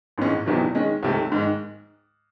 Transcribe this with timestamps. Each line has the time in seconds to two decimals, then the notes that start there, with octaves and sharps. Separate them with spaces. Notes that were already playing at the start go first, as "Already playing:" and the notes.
0.18 A1 G#2 D#3 G#3 C#4
0.46 E1 E2 C3 D#3 F#3
0.75 D#3 G#3 C#4
1.03 C#2 C3 D#3 A3
1.32 G#2 D#3 G#3